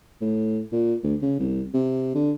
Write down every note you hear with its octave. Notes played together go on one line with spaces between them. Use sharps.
A2
A#2
D2
C#3
C2
C3
D3